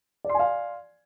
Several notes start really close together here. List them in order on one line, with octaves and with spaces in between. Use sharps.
D5 C6 G#5 F5